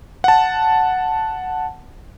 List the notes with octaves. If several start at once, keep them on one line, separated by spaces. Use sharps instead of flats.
F#5 A5